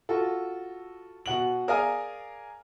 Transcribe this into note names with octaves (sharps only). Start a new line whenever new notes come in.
F4 F#4 A4
B2 F#5 F#7
G#4 A#4 D5 F5 G#5 D#6